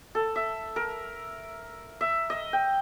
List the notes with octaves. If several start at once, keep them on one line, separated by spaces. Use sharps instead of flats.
A4
E5
A#4
E5
D#5
G5